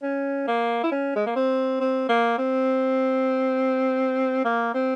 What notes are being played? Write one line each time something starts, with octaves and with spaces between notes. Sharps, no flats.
C#4
A#3
E4
C#4
G#3
A#3
C4
C4
A#3
C4
A#3
C4